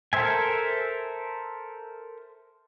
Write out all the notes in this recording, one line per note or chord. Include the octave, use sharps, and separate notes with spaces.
A4 A#4 C5 E5 G#5